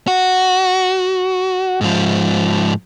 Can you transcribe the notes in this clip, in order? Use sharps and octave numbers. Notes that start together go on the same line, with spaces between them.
F#4
G#2 F3